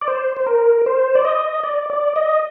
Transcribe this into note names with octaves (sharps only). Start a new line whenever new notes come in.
D5
C5
C5
A#4
C5
D5
D#5
D5
D5
D#5